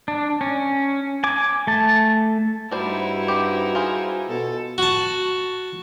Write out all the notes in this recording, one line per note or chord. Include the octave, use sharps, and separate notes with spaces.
D4
C#4
G#5 D6
A3 A5
G2 G3 D#4 E4 F#4 C5
C4 G4
F4 G#4 C5
B2 A4
F#4 A5